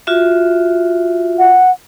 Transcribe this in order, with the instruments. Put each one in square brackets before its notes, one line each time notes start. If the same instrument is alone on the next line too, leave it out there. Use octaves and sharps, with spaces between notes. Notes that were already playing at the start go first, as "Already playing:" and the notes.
[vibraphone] F4 F#4 E5
[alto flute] F#5